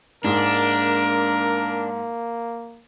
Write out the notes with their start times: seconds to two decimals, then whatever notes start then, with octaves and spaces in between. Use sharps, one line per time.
0.24 G#2 G#3 A#3 D4 A#4